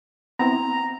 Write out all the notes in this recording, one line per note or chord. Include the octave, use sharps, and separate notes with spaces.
B3 C4 E4 A#5